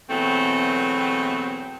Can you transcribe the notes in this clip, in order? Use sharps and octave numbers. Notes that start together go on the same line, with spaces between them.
E2 B2 F#3 A3 C4